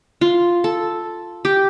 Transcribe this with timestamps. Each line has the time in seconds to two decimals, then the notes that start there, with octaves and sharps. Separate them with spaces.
0.21 F4
0.64 A4
1.45 G4